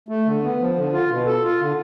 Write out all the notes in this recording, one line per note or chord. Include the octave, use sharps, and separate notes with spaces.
A3
D3
B3
F3
D3
F4
B2
A4
F4
D3